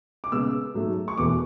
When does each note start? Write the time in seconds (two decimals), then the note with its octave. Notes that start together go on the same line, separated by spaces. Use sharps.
0.24 D6
0.32 C#3 G#3 B3 E6
0.74 G#2 F#3 A3
1.08 C#6
1.17 E2 B2 A3 D6